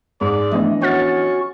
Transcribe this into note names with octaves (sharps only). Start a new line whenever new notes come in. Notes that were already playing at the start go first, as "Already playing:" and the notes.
G#2 D5
E3 F3 A3 B3 D4 D#5
C#4 F#4 F#5 F6 A6